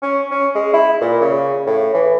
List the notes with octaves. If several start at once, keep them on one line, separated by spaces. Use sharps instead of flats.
C#4
C#4
G#3
E4
A#2
C#3
A2
E3